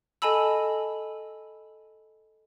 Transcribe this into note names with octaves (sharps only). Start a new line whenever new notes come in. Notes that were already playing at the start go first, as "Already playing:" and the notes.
A4 D#5 G#5 A5 B5 E6